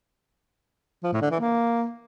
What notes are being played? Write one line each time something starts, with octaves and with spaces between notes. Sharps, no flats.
F3
A2
D3
E3
A#3